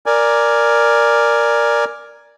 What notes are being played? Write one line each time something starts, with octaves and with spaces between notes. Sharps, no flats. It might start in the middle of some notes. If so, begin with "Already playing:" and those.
A#4 D5 G#5